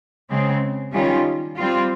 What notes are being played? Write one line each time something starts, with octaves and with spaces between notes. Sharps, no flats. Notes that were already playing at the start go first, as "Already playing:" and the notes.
C#3 G#3 C4
D#3 G3 C#4 F4
G3 C4 F4